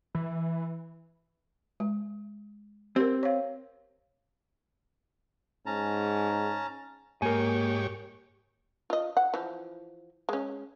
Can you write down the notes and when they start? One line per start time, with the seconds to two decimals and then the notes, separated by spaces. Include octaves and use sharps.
0.15 E3
1.80 G#3
2.96 C4 G4 A#4
3.23 C#5 F5
5.66 G#2 C#4 A5 A#5
7.22 G#2 A#3 G4 A#4 C#5 G#5
8.90 F4 D#5
9.17 F#5
9.34 E3 F3
10.29 G#3 C#4